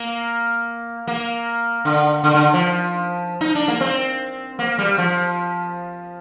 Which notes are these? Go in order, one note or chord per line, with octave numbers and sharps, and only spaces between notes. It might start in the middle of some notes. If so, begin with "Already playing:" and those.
Already playing: A#3
A#3
D3
D3
D3
F3
D#4
D4
A#3
C4
A#3
G3
F3